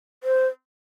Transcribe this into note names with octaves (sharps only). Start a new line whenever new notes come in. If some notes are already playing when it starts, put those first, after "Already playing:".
C5